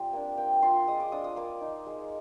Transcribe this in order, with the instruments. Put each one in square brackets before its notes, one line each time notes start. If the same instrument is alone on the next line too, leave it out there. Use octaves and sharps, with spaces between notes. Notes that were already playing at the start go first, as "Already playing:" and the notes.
Already playing: [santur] G3 C4 F4
A#3 D4
A#3 G5
F4 C6
G#3 D#6
D6
D4 F4 D#6
D#6
A#3 D6
D#4
G#3